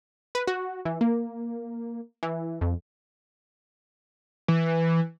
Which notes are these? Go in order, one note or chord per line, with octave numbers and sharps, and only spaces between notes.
B4
F#4
E3
A#3
E3
F2
E3